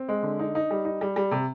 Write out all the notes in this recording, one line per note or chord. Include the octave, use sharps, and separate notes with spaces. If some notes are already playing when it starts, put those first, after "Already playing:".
Already playing: C4
G#3
D3
D#4
D#4
G3
D#4
G3
G3
C3